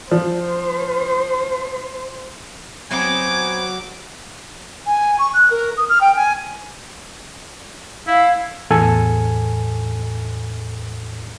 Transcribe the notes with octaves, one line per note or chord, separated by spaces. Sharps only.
F3 C5
F#3 B3 C4 D#4 G#5 D6
G#5
C#6
F#6
A#4
D#6
F6
G5
G#5
E4 F5
E2 A2 A4 G#5